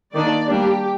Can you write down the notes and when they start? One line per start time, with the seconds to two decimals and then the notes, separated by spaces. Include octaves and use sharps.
0.14 D#3 A#3 D4 D5
0.49 G3 A#3 D4 G4